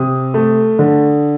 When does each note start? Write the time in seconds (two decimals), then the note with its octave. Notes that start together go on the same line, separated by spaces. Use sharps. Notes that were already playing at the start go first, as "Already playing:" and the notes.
Already playing: C3 D#6
0.34 A3
0.79 D3